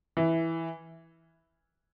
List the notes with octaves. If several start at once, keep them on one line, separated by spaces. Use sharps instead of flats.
E3